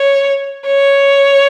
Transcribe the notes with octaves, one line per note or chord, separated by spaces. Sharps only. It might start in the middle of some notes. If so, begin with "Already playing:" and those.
Already playing: C#5
C#5